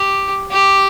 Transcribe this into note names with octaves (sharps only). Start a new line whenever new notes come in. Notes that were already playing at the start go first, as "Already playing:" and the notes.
Already playing: G4
G4